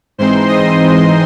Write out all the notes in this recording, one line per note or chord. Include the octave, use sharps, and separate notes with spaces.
G#2 E3 G#3 C4 D#4 C5 C6
D#5 D#6
D#5 D#6